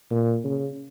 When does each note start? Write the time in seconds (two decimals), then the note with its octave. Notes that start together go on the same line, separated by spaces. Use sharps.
0.11 A#2
0.44 C#3